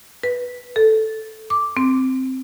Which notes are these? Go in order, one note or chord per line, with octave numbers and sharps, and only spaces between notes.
B4
A4
D6
C4